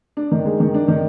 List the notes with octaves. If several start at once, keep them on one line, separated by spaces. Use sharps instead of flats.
D4
D#3
G#3
D#3
D4
D#3